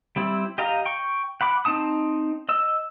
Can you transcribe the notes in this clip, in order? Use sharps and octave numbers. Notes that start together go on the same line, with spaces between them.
G3 C4 E4
G4 D#5 F5 A#5
G5 C#6
F#5 B5 D6
C4 D#4 A5 D#6
D#5 E6